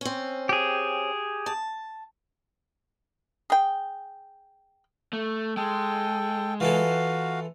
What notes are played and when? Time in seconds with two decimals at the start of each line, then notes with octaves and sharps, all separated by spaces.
0.01 C4 C#4
0.49 G4 G#4
1.46 A5
3.50 G#4 G5
5.13 A3
5.57 G#3 A4 G5
6.60 E3 F4 F#4 A4 F5